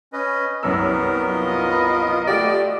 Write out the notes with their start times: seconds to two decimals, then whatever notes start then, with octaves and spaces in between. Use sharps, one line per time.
0.13 C#4 B4 D#5
0.63 C2 F#2 B3 A#4 E6
1.31 F4 D#5
1.71 B4
2.27 A3 F#4 G4 D5